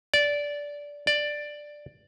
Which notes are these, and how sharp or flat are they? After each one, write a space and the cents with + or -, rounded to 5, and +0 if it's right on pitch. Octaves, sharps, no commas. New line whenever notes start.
D5 -15
D5 +5